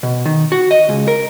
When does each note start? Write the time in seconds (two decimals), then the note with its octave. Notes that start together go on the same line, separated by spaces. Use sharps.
0.03 B2
0.26 D#3
0.52 F#4
0.71 D#5
0.89 C#2
1.08 A#4